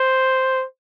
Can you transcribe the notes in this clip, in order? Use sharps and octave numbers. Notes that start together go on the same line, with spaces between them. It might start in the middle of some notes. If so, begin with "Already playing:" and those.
Already playing: C5